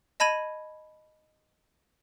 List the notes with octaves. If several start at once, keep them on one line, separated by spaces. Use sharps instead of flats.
D#5 A5 B5 G#6 D#7 F#7